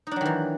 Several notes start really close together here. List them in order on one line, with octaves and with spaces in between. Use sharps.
D#4 D4 F#3 D#3 E3